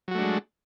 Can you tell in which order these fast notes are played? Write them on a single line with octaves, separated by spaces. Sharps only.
F#3 F#4 A3 D4 G#3